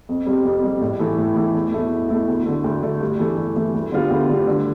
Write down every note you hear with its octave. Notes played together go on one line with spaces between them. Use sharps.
F2
C3 G3
F2
C3 G3
A2
E3 A3 E4
A2
E3 A3 E4
E2
B2 A3 E4
E2
B2 A3 E4
D2
D3 A3
D2
D3 A3
G2
E3 A3
G2
E3 A3
D2
D3 G3 B3 F4
D2
D3 G3 B3 F4
D3